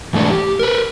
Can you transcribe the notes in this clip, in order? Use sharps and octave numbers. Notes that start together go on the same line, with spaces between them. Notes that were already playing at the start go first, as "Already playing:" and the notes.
E2 G#2 A3 D4 B4
G4
A#4 B4